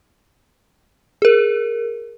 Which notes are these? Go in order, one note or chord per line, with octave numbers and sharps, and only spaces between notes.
G#4 A#4